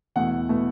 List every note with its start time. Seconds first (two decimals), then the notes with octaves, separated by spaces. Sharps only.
0.16 E2 B2 A3 F#5
0.49 B2 A3